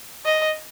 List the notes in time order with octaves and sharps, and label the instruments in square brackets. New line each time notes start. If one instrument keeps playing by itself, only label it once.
[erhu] D#5